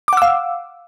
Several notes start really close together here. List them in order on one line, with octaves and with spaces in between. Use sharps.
D6 F#5 E6 F5